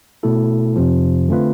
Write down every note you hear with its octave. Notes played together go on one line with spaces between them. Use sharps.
B2 A3 E4 A4
F2 C3 F3
D3 A3 C4 F4 B4